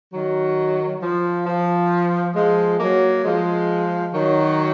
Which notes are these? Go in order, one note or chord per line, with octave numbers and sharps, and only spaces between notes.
D#3 F#3
F3
F3
F3 G#3
F#3 A#3
F3 G#3
D#3 F#3